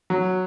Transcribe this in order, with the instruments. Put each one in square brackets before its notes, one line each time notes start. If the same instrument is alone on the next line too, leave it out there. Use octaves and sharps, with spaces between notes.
[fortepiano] F#3